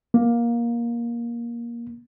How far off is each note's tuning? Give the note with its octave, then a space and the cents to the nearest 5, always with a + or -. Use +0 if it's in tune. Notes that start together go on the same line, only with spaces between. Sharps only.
A#3 +15